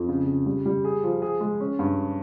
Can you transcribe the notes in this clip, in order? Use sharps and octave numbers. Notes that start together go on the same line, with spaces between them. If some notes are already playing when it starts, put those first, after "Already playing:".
Already playing: F2
C#3
C#3
G3
G3
G#4
F3
G#4
G#3
C#4
G2